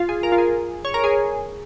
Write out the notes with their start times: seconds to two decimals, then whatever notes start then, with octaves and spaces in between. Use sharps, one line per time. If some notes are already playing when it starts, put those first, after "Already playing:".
Already playing: F4
0.09 G#4
0.23 A#4
0.32 F4
0.38 G#4
0.85 C#5
0.94 A#4
1.04 G#4